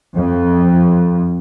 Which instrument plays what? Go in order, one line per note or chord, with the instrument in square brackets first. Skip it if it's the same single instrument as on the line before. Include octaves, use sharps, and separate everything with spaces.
[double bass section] F2